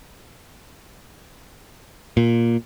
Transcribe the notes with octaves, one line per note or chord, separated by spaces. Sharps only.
A#2